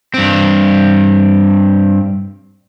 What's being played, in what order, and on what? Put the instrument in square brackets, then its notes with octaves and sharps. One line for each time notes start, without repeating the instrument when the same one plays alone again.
[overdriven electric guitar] G2 C4